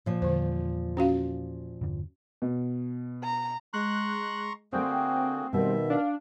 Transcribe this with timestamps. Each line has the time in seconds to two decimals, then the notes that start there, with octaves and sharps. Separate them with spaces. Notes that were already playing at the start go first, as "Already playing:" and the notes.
0.06 A#2 F3
0.22 E2 D3 G3 C5
0.97 C#4 F#4 F5
1.81 E2 G2 D3
2.42 B2
3.24 A#5
3.73 G#3 A#5 C6 C#6 F#6
4.73 D3 A3 A#3 C4 F#4 G#4 G5
5.53 B2 D#3 G3 B3 E5
5.90 D4 F5